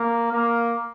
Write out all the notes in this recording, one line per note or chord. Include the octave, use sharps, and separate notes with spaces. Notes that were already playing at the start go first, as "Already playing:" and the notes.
Already playing: A#3
A#3